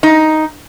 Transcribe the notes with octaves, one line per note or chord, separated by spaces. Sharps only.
D#4